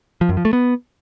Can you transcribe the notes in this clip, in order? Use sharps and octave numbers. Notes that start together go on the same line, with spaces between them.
F3
F#2
F3
A3
B3